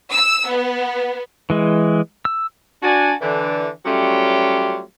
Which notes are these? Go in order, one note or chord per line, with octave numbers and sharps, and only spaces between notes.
E6
B3
E3 G#3
E6
D4 F#4 G#5
D3 E3 D4
F#3 G3 A3 C#4 F4 G4